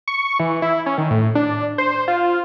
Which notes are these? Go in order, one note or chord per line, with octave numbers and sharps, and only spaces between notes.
C#6
E3
E4
C#4
D#3
A2
D4
C5
F4